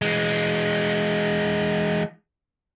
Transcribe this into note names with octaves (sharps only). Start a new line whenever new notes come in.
E3 G#3